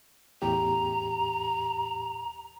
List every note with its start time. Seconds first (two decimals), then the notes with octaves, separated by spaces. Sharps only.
0.42 E2 A2 G4 A#5